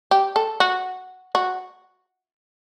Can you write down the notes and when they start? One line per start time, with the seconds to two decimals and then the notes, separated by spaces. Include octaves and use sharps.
0.11 G4
0.36 A4
0.60 F#4
1.35 F#4